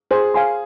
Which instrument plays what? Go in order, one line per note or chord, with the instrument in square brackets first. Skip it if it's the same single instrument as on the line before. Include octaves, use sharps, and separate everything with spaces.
[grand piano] G#4 [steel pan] C5
[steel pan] F5 G#5 C6